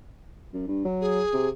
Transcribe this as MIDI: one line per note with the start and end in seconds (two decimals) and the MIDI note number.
0.54 0.66 42
0.68 0.82 43
0.85 1.21 54
1.01 1.48 68
1.33 1.49 48